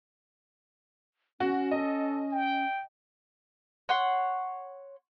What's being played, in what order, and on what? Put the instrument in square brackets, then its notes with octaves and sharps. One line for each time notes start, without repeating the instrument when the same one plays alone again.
[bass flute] C#4 [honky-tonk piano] F#4
[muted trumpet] A4 [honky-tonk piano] D#5
[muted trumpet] G5
[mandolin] C#5 F#5 C6